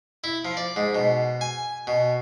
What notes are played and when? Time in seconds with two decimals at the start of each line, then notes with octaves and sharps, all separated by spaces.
0.24 E4
0.45 F3
0.57 D5
0.76 G#2
0.95 B2
1.41 G#5
1.87 B2